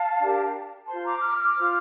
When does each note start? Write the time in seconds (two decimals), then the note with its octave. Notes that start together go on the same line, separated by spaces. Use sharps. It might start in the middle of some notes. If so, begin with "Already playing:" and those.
Already playing: F5 A5
0.19 D4 G4 A#4
0.86 F4 C5 A5 C6
1.04 A#5 D6
1.21 D6 F6
1.38 D6 F6
1.56 F4 C5